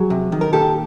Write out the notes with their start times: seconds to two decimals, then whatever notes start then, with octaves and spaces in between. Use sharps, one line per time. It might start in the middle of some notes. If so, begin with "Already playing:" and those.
Already playing: F#3 F#4 G#4
0.10 C3
0.32 D#3
0.41 A#4
0.53 A#2 G4 A4